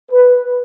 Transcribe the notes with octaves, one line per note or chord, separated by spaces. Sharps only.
B4